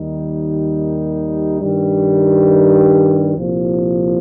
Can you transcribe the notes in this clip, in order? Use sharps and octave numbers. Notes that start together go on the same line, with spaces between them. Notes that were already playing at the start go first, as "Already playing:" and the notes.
Already playing: D#2 D#3 G3 D#4
G2 D#3 G3
C2 A#2 F3